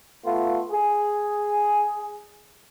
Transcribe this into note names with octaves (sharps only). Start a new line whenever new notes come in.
A3 B3 F4
G#4